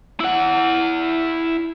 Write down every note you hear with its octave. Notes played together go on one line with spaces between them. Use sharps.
E4 F#5